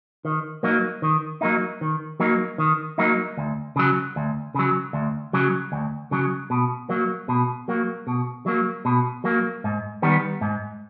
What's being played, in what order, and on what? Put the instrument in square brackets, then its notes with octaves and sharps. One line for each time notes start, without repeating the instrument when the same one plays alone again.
[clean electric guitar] D#3
F#3 A#3 D#4
D#3
F#3 A#3 D#4
D#3
F#3 A#3 D#4
D#3
F#3 A#3 D#4
D2
C#3 F#3
D2
C#3 F#3
D2
C#3 F#3
D2
C#3 F#3
B2
F#3 A#3
B2
F#3 A#3
B2
F#3 A#3
B2
F#3 A#3
G#2
D#3 G3 B3
G#2